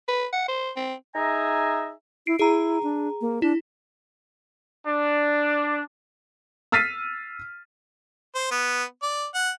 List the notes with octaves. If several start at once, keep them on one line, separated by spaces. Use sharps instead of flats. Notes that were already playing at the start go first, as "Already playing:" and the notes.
B4
F#5
C5
C4
D#4 G#4 E5 G#5 A#5
E4 C7 D7
E4 G#4 A#5
D4
A#3
D4 E4
D4
E6 F6 A6 B6 C7 D#7
C5
B3
D5
F#5